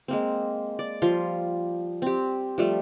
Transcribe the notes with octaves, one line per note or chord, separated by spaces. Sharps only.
G#3 A#3 C4
D5
F3 G3 F5 C6
C4 G4
F3 G3 A3